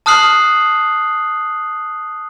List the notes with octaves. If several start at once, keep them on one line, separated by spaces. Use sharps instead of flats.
A5 D#6 F6 F#6 C7 F#7